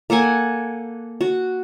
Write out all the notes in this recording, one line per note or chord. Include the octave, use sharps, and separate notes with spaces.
A#3 A4 F#5 G#5
F#4